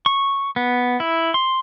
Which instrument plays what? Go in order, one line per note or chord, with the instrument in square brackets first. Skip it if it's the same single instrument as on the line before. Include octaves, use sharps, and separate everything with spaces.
[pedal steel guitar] C#6
B3
E4
C6